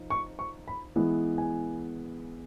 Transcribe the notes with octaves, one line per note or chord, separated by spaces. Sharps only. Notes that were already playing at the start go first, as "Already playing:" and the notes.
Already playing: F3 D#4
C#6
C#6
B5
E3 G#3 B3 E4
G#5